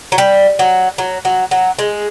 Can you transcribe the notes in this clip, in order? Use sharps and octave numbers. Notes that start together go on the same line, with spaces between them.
F#3
G3
F#3
F#3
F#3
F#3
G#3